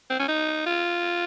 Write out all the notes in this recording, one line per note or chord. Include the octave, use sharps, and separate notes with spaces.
C4
C#4
D#4
F4